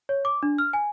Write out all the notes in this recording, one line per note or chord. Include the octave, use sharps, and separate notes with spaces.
C#5
D6
D4
F6
G#5